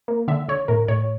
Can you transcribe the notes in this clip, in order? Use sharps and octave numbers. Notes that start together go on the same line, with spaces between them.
A#3
D3 E5
D3 C#5
A2 A#4
A2 C#5